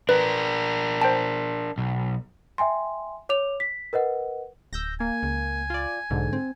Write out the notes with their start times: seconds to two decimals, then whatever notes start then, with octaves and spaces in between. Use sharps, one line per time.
0.09 D4 A#4 B4
1.01 C5 G5 A5
1.78 B1
2.58 E5 G5 G#5 C6
3.29 C#5 D6 F7
3.60 B6
3.93 A#4 B4 D#5 F#5
4.73 D1 E6 G6 A#6
5.00 A#3 G#5
5.23 C#2
5.70 F4 D5
6.10 B1 G#2 D3
6.33 C4